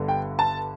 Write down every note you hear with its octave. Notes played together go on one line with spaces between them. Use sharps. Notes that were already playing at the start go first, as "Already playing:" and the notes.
Already playing: G1 G2 D3
G5
A5